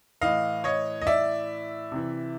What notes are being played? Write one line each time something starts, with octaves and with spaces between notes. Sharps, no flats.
A2 E3 D#5 F5
C#5 D#5
D#5
D5 E5
C3 E3